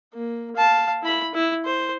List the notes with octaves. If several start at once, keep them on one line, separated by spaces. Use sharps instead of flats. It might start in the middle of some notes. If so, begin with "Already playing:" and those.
A#3
F5 A5
E4 B5
E4
C5